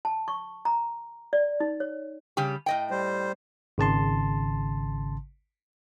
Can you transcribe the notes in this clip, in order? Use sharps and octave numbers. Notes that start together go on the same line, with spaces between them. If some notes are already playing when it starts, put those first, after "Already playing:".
A5
C#6
A#5
D5
D#4
C#5
C#3 G3 G4
A2 D#5 G5
G3 C5
G#1 C#3 A5 C6